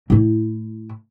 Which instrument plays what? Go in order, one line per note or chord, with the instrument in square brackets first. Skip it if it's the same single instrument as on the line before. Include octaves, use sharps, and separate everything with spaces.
[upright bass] A2 E4